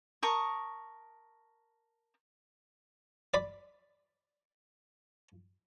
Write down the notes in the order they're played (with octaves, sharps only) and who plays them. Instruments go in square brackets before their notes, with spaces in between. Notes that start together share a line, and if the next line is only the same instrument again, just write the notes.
[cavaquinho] A#4 A5 C#6 D#6
[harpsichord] D5 B5